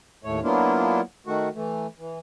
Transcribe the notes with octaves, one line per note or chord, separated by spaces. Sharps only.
D#2 A2 A3 C#5
F#3 A#3 B3 D4 E4 F4
D#3 A3 F#4
E3 A3
E3